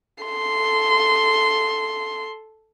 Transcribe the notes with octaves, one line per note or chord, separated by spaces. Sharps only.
A4 C6